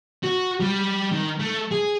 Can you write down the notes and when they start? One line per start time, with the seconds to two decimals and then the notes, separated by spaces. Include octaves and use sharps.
0.23 F#4
0.60 G3
1.12 D#3
1.39 A3
1.71 G#4